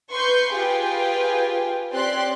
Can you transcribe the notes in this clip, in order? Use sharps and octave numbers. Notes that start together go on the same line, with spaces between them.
B4 C6 C#6 G6
F4 G4 G#4 B4 G5
C4 G4 C#5 D5 C6 F#6